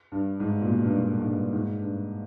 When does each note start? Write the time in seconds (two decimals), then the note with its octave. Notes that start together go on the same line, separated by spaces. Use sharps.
0.12 G2
0.40 G#2
0.62 A#2
0.68 B2
0.84 G2
0.96 G#2
1.19 G#2
1.24 G2
1.53 G#2
1.81 G2